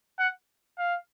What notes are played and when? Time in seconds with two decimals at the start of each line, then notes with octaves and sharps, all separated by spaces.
0.19 F#5
0.78 F5